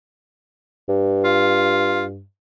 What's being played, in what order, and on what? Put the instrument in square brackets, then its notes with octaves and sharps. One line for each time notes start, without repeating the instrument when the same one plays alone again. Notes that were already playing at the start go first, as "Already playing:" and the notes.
[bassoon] G2
[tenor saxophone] F4